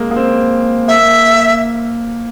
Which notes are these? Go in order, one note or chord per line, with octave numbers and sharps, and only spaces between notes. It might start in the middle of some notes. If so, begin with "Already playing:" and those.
Already playing: G#3 A#3
A#3
C4
A#3 E5